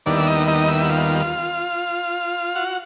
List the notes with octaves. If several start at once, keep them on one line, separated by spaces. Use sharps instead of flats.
D#2 D#3 G3 B3 D4 E4 D5
E5
D#4 D#5
D#4 D#5
E4 E5
F#5
F4 F5
F#4 F#5